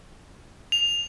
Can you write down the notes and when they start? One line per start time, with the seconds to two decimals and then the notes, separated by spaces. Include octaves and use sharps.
0.72 F7